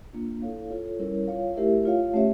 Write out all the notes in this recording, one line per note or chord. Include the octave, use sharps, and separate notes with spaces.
A#3 D4 F4
E4 A4 C#5 F5
F4 A4 C#5
G3 C#4 E4 A#4 C#5
F4 C#5 F5
A3 E4 G4 A#4 E5
F4 C#5 F5
A3 C#4 G4 C#5 E5